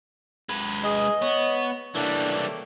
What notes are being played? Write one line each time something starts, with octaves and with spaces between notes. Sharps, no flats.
G#3 B4
G#4 D#5
B3 C#5
C#3 E3 G3 A3 A#3 D4